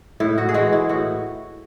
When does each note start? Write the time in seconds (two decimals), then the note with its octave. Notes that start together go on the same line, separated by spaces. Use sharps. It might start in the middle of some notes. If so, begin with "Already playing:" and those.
0.20 A2 E4
0.38 F#4
0.49 G#4
0.54 E3 G#3 F#4
0.73 E4
0.89 A2 F#4